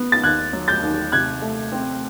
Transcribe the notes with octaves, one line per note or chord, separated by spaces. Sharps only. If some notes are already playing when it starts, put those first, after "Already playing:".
Already playing: B3
A6
D#2 F#6 G#6
F#3
G6 A6
D#2
C3 F#6 G#6
A3
C4